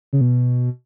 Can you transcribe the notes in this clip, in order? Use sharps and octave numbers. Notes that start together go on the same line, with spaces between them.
C#3
B2